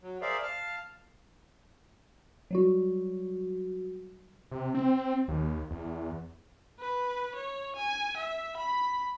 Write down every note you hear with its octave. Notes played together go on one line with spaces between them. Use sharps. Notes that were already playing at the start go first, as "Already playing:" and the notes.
F#3
G#4 A#4 C5 D5 E5 F5
F5 A5 F6
F#3 G3 F#4
C3
C4
D#2
E2
B4
C#5
G#5
E5
B5